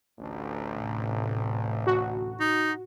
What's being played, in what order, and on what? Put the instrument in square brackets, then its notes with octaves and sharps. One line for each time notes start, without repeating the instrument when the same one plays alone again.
[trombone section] A1 D2
[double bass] A2 C3
[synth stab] F#4
[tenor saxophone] D#4